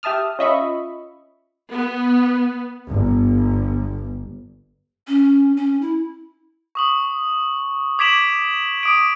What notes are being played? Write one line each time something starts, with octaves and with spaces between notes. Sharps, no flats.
G4 E5 A5 D#6 F6
C#4 F4 D#5 E5 B5 C#6
B3
G1
C#4
C#4
E4
C#6 D#6 F#7
D6 G#6 B6 D7 E7 F#7
D6 D#6 D7